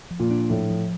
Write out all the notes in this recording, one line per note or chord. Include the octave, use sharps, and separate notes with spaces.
F3
A#2
D4
A2 F3
F3